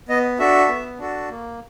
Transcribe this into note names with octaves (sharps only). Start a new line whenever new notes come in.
B3 D#5
D4 F#4 A4 E5
B3
D4 F#4 A4
A#3